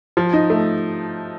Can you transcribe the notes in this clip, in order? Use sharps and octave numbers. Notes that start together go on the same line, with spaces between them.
F3
D#4
A3